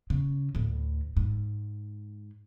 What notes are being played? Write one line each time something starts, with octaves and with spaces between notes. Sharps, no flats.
C#3
D2 A2
G#2